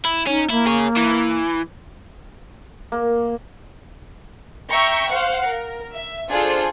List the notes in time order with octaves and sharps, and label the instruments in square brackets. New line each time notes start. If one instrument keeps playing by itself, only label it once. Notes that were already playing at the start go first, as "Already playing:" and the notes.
[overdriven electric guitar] E4
[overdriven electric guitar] C#4 [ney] D#4
[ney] A#3 [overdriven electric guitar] E4
[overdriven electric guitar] G#4 C#5
E3
[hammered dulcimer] A#3
[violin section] E5 G5 A#5 C#6
C5 F5 F#5
A#4
E5
D4 F4 G#4 A4 C5